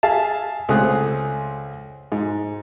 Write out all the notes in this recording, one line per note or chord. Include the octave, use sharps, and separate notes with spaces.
G#4 E5 F5 A5
C#2 A3 C4 G#4 D#6 F#6
G#2